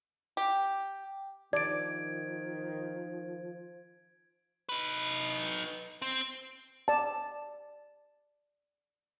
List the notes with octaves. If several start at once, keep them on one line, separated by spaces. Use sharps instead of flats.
G4
D#3 F3 D5 G#6 D7
D#4 B4
C4
D5 A5